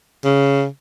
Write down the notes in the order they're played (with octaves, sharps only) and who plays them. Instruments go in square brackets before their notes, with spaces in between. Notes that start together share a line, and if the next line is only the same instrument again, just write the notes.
[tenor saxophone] C#3